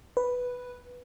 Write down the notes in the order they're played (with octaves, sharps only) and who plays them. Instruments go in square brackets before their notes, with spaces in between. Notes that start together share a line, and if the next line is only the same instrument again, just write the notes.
[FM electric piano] B4